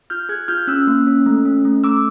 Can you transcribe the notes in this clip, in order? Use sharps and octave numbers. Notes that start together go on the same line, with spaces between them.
F4 F6 G6
G#4 F#6 G#6
F4 F6 G6
C#4 E6 F#6
A#3
C#4
A3
C#4
A3
A3 D6 E6